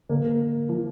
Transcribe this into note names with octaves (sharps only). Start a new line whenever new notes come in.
D3 A#3
F3